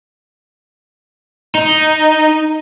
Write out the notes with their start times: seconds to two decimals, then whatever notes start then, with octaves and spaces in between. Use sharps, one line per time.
1.55 D#4